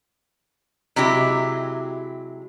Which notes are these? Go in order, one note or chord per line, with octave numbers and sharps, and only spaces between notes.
C3 F#3 G#3 E4 G4